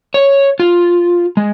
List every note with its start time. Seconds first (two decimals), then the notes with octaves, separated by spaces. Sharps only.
0.14 C#5
0.60 F4
1.37 G#3